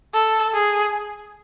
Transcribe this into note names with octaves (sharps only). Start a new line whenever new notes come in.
A4
G#4